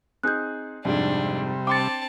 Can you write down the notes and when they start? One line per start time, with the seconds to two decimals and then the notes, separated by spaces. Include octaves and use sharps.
0.23 C4 D#4 G#4 F#6 G6
0.85 F2 G#2 C3 G3 D4
1.67 C4 G5 A5 C6 D6 A6 C#7